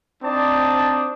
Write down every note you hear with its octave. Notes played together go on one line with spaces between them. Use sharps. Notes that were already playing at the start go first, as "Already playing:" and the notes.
C4 D4 D#4 D5 A5 D#6